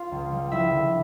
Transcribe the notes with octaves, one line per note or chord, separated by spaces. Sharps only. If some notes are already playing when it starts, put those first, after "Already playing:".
Already playing: F4 F5
C#2
G3
F3 E4 E5
D3